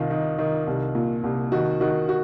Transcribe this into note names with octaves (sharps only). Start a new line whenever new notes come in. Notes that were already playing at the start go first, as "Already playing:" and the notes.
Already playing: C2 D#3 F4
D#3
D#3
C2
A#2
C2
D#3 F#4
D#3 F#4
F#4